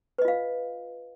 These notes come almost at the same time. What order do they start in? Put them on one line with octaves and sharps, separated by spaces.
B4 D#5 F4 F5